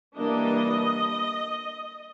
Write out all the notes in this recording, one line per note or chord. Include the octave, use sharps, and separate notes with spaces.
E3 G3 A#3 D4 D#5